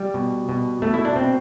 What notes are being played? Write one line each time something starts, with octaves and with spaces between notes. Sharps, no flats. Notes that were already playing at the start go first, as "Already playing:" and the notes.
Already playing: G3
B2
B2
B2 A3
E4
D4
B2 C4